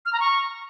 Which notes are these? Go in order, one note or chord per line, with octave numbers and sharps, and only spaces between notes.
F6
A#5
C#6